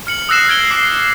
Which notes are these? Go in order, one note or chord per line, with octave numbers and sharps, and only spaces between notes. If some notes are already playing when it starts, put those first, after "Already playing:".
F6 C#7 F#7
D#6 E6 F#6 A#6 C7 E7
F6 G#6 A#6 D7 G7
D6 C7